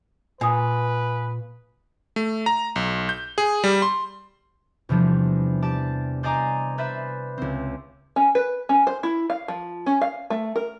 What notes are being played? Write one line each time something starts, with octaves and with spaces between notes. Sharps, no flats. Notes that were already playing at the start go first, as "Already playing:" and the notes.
A#2 B4 G#5 D#6
A3
A#5
B1
G6
G#4
G3
C6
E2 C3 F3 G3 D4
G4 D5 A5
C5 D5 D#5 G#5 A#5 D6
B4 C5 D5 E5 B5
C#2 C4
C#4
B4
C#4
C5
E4
F5
F3
C#4
F5
A3
A#4